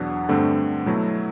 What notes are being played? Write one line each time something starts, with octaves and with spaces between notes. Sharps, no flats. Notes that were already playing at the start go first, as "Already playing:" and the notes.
Already playing: E2 B2 F#3 B3 D4 F#5
G2 D3 A3 C4
B2 F#3 A3 E4